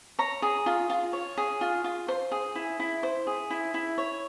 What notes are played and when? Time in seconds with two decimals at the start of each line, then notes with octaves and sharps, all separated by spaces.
0.19 C#5 A#5
0.42 G#4
0.66 F4
0.90 F4
1.13 C#5
1.38 G#4
1.61 F4
1.84 F4
2.08 C5 C6
2.32 G#4
2.55 E4
2.80 E4
3.03 C5
3.27 G#4
3.50 E4
3.74 E4
3.98 C#5